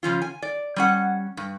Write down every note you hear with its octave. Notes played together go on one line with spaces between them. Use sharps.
C#3 F3 C#4 F4
G#5
D5
G3 C#4 F#5
G2